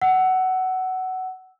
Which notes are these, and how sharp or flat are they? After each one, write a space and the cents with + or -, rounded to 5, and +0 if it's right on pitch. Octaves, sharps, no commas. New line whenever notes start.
F#5 +15 E6 +0